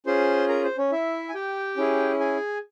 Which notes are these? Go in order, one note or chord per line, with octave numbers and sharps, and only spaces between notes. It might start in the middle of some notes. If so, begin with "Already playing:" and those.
C#4 F4 G#4 C5 C6
A#4 A#5
C5
C#4 C#5
E4 E5
G#5
G4 G5
C#4 E4 G#4
G#4 G#5